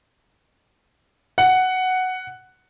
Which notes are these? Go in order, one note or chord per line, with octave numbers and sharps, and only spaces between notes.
F#5